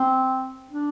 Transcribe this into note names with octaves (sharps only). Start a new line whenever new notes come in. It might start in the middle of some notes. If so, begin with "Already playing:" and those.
Already playing: C4
D4